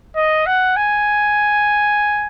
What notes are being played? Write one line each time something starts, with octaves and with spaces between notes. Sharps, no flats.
D#5
F#5
G#5